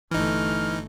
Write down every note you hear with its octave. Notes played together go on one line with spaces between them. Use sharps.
G1 E3 A3 D#4 F6